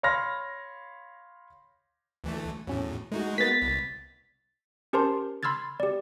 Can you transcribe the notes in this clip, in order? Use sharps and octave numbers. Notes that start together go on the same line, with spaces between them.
C#5 F5 B5 C6 F6 A#6
D2 E3 A3
E2 A2 F#3 C#4
G#3 A3 D#4 F#4
A#3 B3 B4 A6 B6
C2
C#4 G4 A#4 C5 A5 C6
B5 C6 E6 F6 G#6 A6
G4 D5